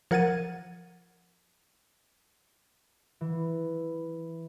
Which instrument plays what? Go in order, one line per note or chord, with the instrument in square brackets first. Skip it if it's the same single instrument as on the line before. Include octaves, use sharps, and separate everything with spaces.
[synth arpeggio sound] F3 A#4 F#5 G#6 A6 D#7
[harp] E3